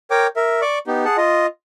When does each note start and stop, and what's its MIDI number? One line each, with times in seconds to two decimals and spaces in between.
0.11 0.27 70
0.11 0.27 73
0.11 0.27 79
0.11 0.27 86
0.36 0.61 70
0.36 0.61 76
0.62 0.79 74
0.62 0.79 85
0.62 0.79 86
0.87 1.05 59
0.87 1.05 63
0.87 1.05 67
1.05 1.17 68
1.05 1.17 78
1.05 1.17 81
1.17 1.46 65
1.17 1.46 75